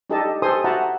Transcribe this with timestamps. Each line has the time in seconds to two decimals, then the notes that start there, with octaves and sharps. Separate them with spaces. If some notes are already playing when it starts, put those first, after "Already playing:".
0.10 D4 D#4 G4 A4 D#5 A5
0.42 G4 A4 C5 G#5 C6 D#6
0.64 F#4 E5 F#5 A5 A#5